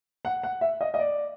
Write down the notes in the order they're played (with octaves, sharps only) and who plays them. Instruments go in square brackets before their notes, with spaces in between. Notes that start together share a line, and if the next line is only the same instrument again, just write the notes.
[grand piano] F#5
F#5
E5
D#5
D#5
D5